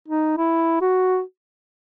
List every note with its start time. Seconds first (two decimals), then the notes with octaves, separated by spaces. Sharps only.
0.08 D#4
0.38 E4
0.81 F#4